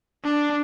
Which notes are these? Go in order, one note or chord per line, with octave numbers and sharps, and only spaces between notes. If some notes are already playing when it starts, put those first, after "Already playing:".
D4